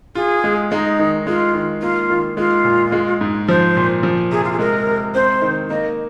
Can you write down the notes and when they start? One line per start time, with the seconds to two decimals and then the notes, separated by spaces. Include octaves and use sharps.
0.15 F4 G#4
0.44 G#3
0.71 G#3 D#4
0.99 D#3
1.27 G#3 F4
1.54 D#3
1.81 A#3 F4
2.10 D#3
2.37 G#3 F4
2.65 A#2
2.92 G#3
3.21 G#2
3.48 F3 C5
3.76 A#2
4.03 F3
4.32 C3 G#4
4.44 F4
4.52 G#4
4.59 G#3 A#4
4.86 C3
5.15 C4 C5
5.42 D#3
5.70 A#3 D#5